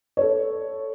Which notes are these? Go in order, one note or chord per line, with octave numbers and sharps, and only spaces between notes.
A4 C#5